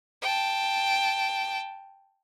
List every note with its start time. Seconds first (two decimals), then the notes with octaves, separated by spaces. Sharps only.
0.22 G5 A5